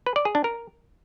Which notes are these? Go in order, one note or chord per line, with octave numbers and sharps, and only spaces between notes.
B4
D5
G#4
D4
A#4